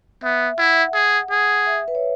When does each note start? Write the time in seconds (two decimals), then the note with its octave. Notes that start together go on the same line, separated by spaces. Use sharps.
0.23 B3 E5
0.58 E4 F#5
0.94 G#4
1.31 G#4 F#5
1.67 E5
1.88 B4
1.95 C#5